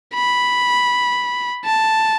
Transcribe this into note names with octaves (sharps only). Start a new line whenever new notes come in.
B5
A5